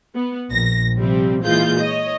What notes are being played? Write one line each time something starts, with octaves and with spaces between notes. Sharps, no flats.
B3
A#1 A#6
C3 F3 G3 C4
A#2 E3 G#3 F4 G6
C#5 D#5